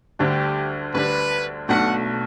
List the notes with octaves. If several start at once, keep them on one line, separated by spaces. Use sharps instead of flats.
D2 D3 G3 D4 G4
D2 D3 G3 D4 B4
B1 B2 A3 D4 F#5